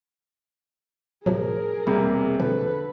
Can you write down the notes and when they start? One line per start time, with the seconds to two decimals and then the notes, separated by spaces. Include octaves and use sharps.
1.26 A2 C3 F3 F#3 G#4 A#4
1.87 E1 C3 G3 A#3 B5
2.40 B2 D3 F3 A4 B4